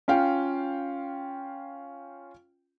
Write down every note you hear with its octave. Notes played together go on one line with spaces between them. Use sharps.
C#4 F4 F5 G5